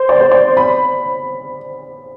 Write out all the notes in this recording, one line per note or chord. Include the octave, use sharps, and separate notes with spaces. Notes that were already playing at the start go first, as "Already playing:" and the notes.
Already playing: C5
D5
C5
D5
B5